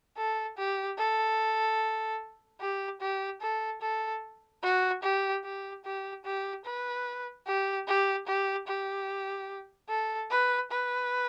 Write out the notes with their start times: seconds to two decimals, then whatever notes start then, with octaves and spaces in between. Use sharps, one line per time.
0.17 A4
0.57 G4
0.98 A4
2.60 G4
3.01 G4
3.41 A4
3.82 A4
4.63 F#4
5.03 G4
5.44 G4
5.85 G4
6.25 G4
6.65 B4
7.47 G4
7.87 G4
8.27 G4
8.68 G4
9.89 A4
10.31 B4
10.71 B4